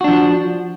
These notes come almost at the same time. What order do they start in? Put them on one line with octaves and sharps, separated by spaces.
F#4 D4 F3